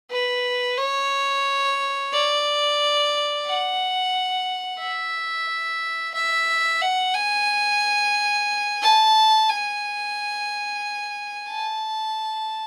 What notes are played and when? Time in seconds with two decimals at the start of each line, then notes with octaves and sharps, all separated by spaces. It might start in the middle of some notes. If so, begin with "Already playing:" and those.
0.11 B4
0.78 C#5
2.12 D5
3.47 F#5
4.80 E5
6.14 E5
6.82 F#5
7.14 G#5
8.82 A5
9.49 G#5
11.49 A5